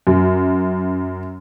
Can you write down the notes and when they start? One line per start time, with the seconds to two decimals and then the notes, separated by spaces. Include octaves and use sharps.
0.07 F#2